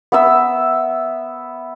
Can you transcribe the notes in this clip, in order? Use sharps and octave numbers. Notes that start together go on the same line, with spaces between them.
B3 E5 E6